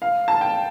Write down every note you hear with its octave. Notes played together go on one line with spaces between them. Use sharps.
F5
A5
G5